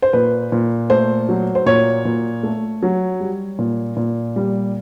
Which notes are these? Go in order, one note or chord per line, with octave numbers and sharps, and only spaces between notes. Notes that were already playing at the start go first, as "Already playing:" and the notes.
C5
A#2 B4
A#2
A3 C5
F#3
C5
A#2 C#5
A#2
A3
F#3
G3
A#2
A#2
G3